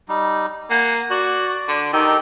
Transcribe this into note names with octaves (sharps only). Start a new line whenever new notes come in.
G3 D#4
A#3 F#5 G#5
F#4 D5
D3
D#3 D#4 G4 A4